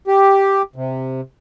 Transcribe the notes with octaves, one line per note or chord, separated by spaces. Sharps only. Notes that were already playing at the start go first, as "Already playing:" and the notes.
G4
C3